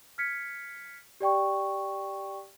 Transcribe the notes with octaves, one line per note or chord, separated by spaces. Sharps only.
F6 G#6 B6 C#7
G4 D5 G5 C#6